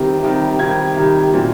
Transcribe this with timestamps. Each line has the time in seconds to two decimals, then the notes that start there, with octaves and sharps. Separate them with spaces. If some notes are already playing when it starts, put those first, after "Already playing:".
Already playing: C3 D#3 G3
0.22 C3 D#3 G3
0.59 C3 D#3 G3 G#6
0.96 C3 D#3 G3
1.33 A#2 F#3